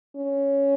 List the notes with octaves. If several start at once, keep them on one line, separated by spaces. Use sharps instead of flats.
C#4